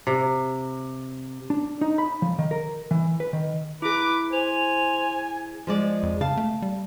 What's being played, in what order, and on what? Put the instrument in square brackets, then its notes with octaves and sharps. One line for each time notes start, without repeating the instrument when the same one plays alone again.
[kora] C3
[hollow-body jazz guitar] D4
D#4
B5
F3
D#3
A#4
E3
B4
D#3
[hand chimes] E4 G#4 [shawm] B4 [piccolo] D6
[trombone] C5 [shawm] G#5 [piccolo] F7
[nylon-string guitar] F3 G#3 D5
[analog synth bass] F2
[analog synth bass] C#3 [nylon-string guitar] F5 A5
[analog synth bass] A3
G3